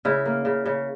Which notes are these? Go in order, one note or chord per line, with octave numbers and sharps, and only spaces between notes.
C#3 E4
A#3
C#3
C#3